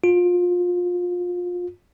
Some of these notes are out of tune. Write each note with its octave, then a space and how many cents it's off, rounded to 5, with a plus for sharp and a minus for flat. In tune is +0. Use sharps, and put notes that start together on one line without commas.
F4 +25